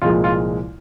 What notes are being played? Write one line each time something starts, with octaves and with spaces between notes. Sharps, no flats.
C2 A#2 F3 G#3 F4
F4